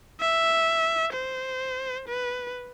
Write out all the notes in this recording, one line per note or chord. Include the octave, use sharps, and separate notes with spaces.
E5
C5
B4